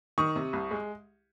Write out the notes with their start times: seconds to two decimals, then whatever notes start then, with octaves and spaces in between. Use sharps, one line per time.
0.18 D#3 C#6 D#6
0.36 C3
0.53 C2
0.71 G#3